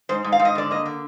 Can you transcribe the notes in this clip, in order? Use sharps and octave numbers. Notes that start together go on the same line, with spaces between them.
G#2 C5
G#2
F5
G#2
D#5
D3 D5
A#3 D#5
D3